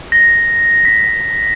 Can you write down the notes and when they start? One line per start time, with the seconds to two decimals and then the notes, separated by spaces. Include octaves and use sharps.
0.12 A#6
0.85 B6